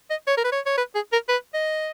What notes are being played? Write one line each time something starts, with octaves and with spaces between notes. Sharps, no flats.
D#5
C#5
A#4
B4
C#5
C#5
B4
G#4
A#4
B4
D#5